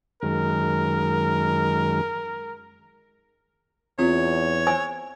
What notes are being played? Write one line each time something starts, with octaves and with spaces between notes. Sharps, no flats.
F#2 D#3 G#3 A#4
E2 C4 F4 C#5
C5 G#5 E6